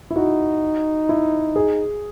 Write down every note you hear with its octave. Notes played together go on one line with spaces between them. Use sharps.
E4
D#4 F#4
E4
G#4